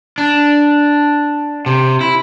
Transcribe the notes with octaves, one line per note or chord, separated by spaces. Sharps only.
D4
C3
E4